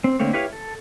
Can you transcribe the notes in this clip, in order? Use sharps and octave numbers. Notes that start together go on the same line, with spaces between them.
C4
D3 A3 A#3 C4 C#5
E4 G4 B4 C#5 F5
A4